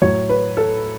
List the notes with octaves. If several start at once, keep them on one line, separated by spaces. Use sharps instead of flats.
A2 F#3 C#5
B4
A4